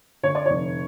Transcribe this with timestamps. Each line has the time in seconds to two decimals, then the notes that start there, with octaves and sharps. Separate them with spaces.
0.23 D3 C#5
0.35 D5
0.46 F1 C#5